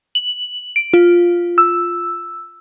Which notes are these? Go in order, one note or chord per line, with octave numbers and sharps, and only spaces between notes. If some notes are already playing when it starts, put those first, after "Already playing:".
F#7
D7
F4
E6